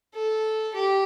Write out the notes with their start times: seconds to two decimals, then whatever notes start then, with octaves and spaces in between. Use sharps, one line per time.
0.15 A4
0.75 G4